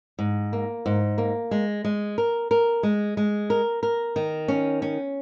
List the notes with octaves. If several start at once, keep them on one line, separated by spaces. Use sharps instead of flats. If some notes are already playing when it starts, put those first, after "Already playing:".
G#2
A#3
G#2
A#3
G#3
G#3
A#4
A#4
G#3
G#3
A#4
A#4
D#3
C#4
C#4